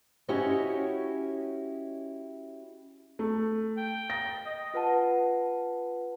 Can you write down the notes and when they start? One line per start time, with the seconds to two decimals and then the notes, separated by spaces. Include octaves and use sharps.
0.28 C#4 E4 F#4 G4 C#5 D#5
3.19 A3
3.77 G5
4.10 A#6
4.46 D#5
4.74 F4 B4 F#5 A5